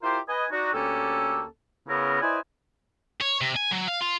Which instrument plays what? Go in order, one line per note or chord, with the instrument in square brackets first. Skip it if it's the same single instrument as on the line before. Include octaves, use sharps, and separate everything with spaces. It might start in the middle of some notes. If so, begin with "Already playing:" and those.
[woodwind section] E4 F4 G4 A#4 C5
B4 D#5 G#5
D4 D#4 F#4
D2 A#3 C#4 G4 A4
C#3 B3 E4 A#4
E4 B4 C5 D5 D#5 G#5
[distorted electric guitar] C#5
C3
G#5
F#3
F5
F4